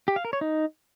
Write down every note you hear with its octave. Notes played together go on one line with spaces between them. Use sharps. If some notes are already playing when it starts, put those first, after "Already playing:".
G4
F5
A#4
C#5
D#4